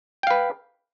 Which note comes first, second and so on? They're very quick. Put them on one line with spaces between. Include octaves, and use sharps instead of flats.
G5 F5 B4